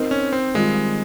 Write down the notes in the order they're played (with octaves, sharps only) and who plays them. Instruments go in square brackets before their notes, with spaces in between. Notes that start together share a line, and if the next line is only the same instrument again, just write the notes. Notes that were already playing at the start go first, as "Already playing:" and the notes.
Already playing: [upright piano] C4 D#4 A#4
[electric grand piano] C#4
C4
[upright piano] D#3 G3 C4 F4 [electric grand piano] G#3